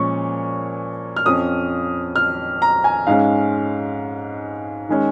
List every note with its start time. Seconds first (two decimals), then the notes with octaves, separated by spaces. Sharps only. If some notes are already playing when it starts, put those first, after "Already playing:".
Already playing: A#2 F3 G#3 C#4 C#6
1.16 F6
1.26 F2 F3 C#4 D#6
2.16 F6
2.62 A#5
2.84 G#5
3.07 G#2 G#3 C#4 F5
4.89 D#3 G#3 C#4